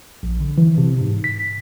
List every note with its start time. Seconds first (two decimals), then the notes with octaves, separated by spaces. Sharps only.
0.23 A#1
0.40 D3
0.58 E3
0.78 C3
1.01 G#2
1.24 B6